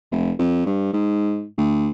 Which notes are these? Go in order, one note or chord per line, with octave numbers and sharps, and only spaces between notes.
F1
F2
G2
G#2
D2